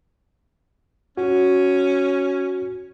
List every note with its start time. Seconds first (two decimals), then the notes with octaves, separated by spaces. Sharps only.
1.17 C#4 F#4